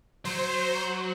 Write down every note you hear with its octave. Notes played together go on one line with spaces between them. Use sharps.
F#3 C5